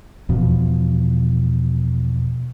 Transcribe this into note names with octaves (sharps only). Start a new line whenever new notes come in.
E2 B2 F3